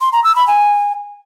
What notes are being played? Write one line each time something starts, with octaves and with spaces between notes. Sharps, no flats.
C6
A#5
E6
B5
G#5